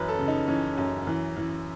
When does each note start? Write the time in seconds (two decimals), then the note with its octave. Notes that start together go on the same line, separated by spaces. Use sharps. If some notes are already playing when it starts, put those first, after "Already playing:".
Already playing: F#2 E3 B4
0.08 A4
0.19 C#3
0.28 D#4
0.48 E3 C#4
0.78 F#2
1.07 E3
1.37 E3